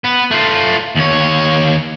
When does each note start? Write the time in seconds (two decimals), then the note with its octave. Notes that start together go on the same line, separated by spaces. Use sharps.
0.05 B3
0.31 A3 F4
0.97 D#2 C#5